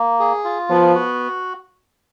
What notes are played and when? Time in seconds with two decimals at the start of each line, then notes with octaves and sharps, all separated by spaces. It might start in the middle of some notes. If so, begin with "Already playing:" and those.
Already playing: A#3
0.19 G#4
0.45 F4
0.70 F3 B3
0.95 F#4